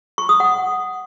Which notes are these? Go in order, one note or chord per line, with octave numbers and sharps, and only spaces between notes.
C#6
D#6
F#5